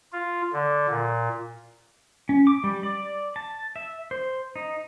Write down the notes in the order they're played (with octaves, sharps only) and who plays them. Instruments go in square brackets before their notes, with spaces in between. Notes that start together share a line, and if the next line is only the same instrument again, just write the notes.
[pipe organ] F4
D3
A#2
[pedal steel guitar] C#4
D6
G3
D5
A5
E5
C5
D#4